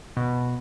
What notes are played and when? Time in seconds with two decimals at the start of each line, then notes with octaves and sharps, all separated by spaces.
0.17 B2